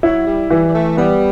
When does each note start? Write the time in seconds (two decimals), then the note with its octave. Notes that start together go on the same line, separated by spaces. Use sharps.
0.03 F#3 E4
0.27 G3
0.50 E3 G3
0.68 G3
0.74 A3
0.97 G3 B3